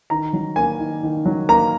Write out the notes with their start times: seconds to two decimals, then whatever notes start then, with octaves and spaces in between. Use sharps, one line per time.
0.10 D#3 A#5
0.33 F#3
0.56 A#3 G#5
0.79 D#3
1.03 D#3
1.26 F#3
1.49 A#3 A#5